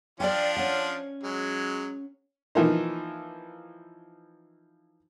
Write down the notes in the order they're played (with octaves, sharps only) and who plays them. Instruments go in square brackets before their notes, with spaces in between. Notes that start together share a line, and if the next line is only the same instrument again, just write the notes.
[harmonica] F3 D4 F4 [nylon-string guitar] D5 G5
[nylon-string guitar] C#4 F#5
[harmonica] F#3 G#3
[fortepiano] E3 F3 A#3 D#4